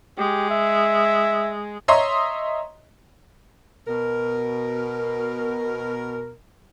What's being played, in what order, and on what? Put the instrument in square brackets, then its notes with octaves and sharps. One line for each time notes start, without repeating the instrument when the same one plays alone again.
[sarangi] G#3 [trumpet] G4
[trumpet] E5
[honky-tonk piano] C#5 D#5 E5 A#5 C6 D#6
[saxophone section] B2 A#4